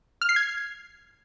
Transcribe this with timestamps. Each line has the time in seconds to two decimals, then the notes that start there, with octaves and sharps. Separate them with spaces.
0.21 F6
0.29 C7
0.36 G#6